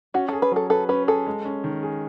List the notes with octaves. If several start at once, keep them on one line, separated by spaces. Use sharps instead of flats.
C#4 F#4
G#4 A4
B4
F#3 A4
A4 B4
C#4 B4
G#4 A4
G#3
C#4
D#3
G#4